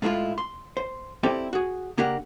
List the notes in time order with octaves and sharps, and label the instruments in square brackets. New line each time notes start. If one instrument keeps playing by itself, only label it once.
[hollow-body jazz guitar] A2 G#3 A3 E4 F4
C6
C5
C4 E4 G4 A4 D5
F#4 G#4
C#3 A#3 D4 G4 A#4 F#5